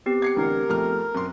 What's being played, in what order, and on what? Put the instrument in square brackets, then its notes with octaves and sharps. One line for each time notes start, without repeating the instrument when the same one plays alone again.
[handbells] B3 C4 G4
[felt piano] G#6 C7 C#7
[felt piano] A1 D3 [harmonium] A#4
[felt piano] F2 A3 F6
[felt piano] F#2 C6 [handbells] C4